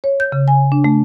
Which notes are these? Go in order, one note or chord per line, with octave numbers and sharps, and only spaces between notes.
C#5
G6
C#3
G#5
D4
A3